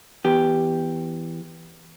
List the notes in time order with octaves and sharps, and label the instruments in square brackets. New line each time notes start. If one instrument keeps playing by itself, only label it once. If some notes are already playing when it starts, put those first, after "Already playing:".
[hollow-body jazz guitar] E2 G4